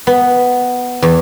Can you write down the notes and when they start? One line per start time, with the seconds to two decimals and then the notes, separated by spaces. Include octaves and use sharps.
0.07 B3
1.02 E2